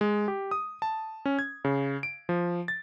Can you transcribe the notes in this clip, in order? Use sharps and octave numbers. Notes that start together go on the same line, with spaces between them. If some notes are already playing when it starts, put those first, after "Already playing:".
G#3
G4
D#6
A5
C#4
G#6
C#3
D7
F3
A6